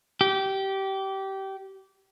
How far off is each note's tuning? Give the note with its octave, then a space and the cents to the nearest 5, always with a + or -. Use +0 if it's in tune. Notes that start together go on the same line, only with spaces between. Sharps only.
G4 -20